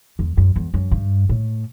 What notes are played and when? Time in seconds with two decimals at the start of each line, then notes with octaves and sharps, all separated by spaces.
0.19 E2
0.37 F#2
0.56 E2
0.74 F#2
0.91 G2
1.29 A2